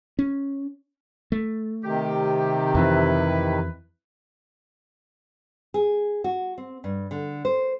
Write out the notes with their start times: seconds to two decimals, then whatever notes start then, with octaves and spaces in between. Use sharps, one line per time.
0.19 C#4
1.32 A3
1.84 C3 D#3 G4
2.75 F2 E3 C4 E4 B4
5.74 G#4
6.24 F#4
6.58 C4
6.84 G2
7.11 D3
7.45 C5